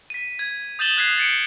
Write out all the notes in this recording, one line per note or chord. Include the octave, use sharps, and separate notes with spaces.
B6 D#7
G#6
D#6 G6 A6 E7 F#7 G7
D#6 F#6 G#6 B6 C7
A6 C#7 D7